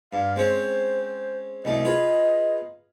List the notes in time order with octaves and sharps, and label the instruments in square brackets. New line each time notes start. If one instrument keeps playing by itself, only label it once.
[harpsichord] G2 [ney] F5
[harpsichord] G#3 C4 C#4 [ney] C5
[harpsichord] C2 F#2 A3 [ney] D#5
[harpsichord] F4 G#4 B4